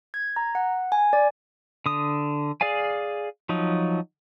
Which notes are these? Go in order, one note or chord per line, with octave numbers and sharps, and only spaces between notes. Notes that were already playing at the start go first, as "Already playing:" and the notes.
G#6
A#5
F#5
G#5
D5
D3 D#6
G#4 D5 F5 G#5
F3 F#3 D#4